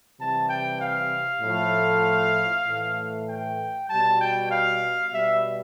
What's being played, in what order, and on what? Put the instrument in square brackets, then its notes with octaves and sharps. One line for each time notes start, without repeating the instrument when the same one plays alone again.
[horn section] C3 E3 G3 A5
G5
F5
A2 F3 A3
A2 E3 A3
G5
B2 G3 A5
G5
F5
B2 G3 E5